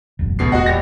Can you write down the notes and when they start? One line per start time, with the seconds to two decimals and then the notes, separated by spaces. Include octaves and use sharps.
0.19 E1 A1 F#2
0.39 D2 B2 C7
0.52 E1 F#4 D#5 F#5
0.66 A#1 G4 A#6